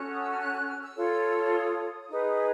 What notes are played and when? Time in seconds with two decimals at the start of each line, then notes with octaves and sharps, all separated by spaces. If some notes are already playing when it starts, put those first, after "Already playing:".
Already playing: C#4 F#4 A4 F#6
0.12 D#6
0.21 E6
0.31 F6
0.40 F#6
0.54 F#6
0.68 F6
0.82 E6
0.97 F4 A4 C#5
1.53 D#6
2.09 D#4 G#4 B4